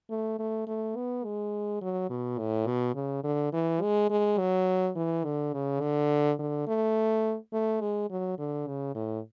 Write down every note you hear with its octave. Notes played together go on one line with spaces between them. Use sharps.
A3
A3
A3
B3
G#3
F#3
B2
A2
B2
C#3
D3
E3
G#3
G#3
F#3
E3
D3
C#3
D3
D3
A3
A3
G#3
F#3
D3
C#3
A2